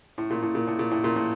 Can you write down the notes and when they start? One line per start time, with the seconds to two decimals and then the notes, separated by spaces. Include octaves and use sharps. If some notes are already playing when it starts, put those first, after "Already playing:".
0.18 A2
0.30 A#2
0.42 A2
0.55 A#2
0.67 A2
0.79 A#2
0.91 A2
1.04 A#2
1.16 A2